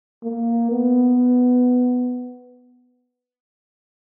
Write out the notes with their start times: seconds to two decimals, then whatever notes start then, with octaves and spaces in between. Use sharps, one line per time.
0.24 A#3
0.71 B3